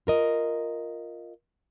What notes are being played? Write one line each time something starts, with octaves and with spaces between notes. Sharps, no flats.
F4 A#4 D#5